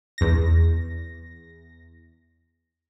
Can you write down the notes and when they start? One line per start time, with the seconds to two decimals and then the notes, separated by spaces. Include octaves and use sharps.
0.18 E2 A#6